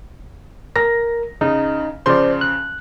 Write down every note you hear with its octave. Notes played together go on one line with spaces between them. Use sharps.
A#4 A#6
C#3 D#4
C#3 F3 C5 D5 C6
F#6